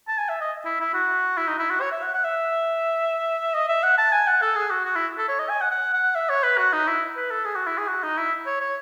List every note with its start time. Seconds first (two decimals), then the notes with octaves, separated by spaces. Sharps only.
0.08 A5
0.18 G#5
0.29 E5
0.41 D#5
0.65 E4
0.80 E4
0.94 F#4
1.37 E4
1.48 D#4
1.59 E4
1.70 F#4
1.81 C#5
1.91 E5
2.03 F#5
2.14 F#5
2.25 E5
3.54 D#5
3.69 E5
3.83 F#5
3.98 A5
4.13 G#5
4.28 F#5
4.42 A4
4.56 G#4
4.71 F#4
4.85 F#4
4.96 E4
5.18 A4
5.28 C#5
5.39 D#5
5.50 G#5
5.61 F#5
5.71 F#5
5.94 F#5
6.15 E5
6.29 C#5
6.43 B4
6.58 F#4
6.73 D#4
6.87 E4
7.17 B4
7.31 A4
7.45 G#4
7.56 F#4
7.67 E4
7.78 G#4
7.88 F#4
8.03 D#4
8.18 E4
8.46 C#5
8.61 C#5